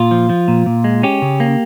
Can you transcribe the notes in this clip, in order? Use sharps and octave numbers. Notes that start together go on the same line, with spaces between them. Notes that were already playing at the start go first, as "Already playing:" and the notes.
Already playing: A#2 F4
F3
F3
A#2
A#2
G#3
C#4 G4
C#3
A#3